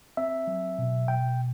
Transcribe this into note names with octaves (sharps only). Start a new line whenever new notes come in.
C4 E5
F#3
B2
B2 G5